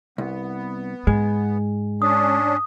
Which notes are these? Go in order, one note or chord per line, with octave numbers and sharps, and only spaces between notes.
C2 B3
G#2 G#3
C#4 D4 D#6